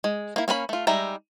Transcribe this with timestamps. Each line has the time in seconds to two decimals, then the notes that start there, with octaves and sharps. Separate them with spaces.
0.04 G#3
0.36 A#3 E4
0.48 A#3 C#4 A#4 B5
0.69 A3 F4
0.87 G3 G#3 D#4 E5 A#5